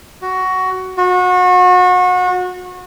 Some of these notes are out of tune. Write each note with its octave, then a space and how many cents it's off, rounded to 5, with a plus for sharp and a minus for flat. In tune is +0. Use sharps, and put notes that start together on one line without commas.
F#4 +10
F#4 -30